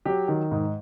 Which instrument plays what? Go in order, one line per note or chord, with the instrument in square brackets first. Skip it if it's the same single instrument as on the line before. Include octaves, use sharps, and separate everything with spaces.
[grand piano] F#3 G4
D#3
G#2